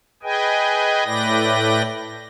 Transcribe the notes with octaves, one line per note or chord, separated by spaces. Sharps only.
G#4 B4 D#5 G5 G#5
A2 A3 B4 D5 G5 A#6